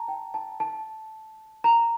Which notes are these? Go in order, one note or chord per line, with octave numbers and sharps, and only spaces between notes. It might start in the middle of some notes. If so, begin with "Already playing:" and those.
Already playing: A5 A#5
G5
A5
A5
A#5